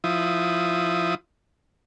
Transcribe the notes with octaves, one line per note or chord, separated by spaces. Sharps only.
F3 E4 D#6